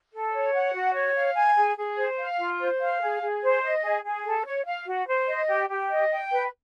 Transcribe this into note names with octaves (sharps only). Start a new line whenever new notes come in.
A4
C#5
F#5
F#4
C#5
F5
G#5
G#4
G#4
C5
F5
F4
C5
F5
G#4
G#4
C5
D#5
G#4
G#4
A4
C#5
F5
F#4
C5
D#5
G4
G4
D#5
G5
B4